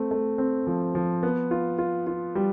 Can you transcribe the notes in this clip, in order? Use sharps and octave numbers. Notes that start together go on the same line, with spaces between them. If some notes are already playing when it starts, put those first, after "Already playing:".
Already playing: A3 C4
A3
C4
F3
F3
B3
F4
F4
F4
G3